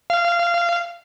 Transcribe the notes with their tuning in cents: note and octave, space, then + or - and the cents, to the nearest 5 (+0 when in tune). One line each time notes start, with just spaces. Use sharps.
F5 -20